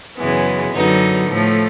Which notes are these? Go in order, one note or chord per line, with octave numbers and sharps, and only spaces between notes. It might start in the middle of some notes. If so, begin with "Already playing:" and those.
F#2 C#3 E3 G#3 B3
F#2 D3 F#3 B3 D#4
A2 F3 A3